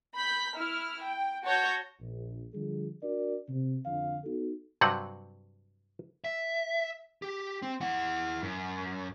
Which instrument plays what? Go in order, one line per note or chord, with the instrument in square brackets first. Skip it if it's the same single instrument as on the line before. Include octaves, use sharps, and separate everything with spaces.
[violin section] B5 G6 B6
E4 F6
G5
F#4 C#5 A5 G6 A#6
[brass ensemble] A#1
D3 F3 G3 G#4
D4 F#4 A#4 D5
C3
F2 D3 D4 F5
B3 D#4 F#4 A4
[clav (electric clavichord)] G2 C3 F#3 C4 F#5
[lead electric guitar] E5
G4
C4
E4 F#5
F#2